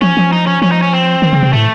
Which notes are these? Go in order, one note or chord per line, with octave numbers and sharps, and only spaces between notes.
F3 C#4
F3
D#4
C#4
F3 C#4
D#4
C#4
C4
D#3
C#3
C3
A2 A3